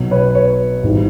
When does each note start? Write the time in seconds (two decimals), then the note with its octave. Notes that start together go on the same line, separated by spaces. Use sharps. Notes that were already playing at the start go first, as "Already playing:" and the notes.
Already playing: B1 B2 F#3
0.11 B4 C#5
0.35 B4 C#5
0.83 G#1 G#2 E3 G3